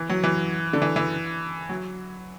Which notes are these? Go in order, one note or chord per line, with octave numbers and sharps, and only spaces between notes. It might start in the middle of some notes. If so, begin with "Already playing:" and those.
Already playing: E3
F#3
E3
D3
E3
E3
F#3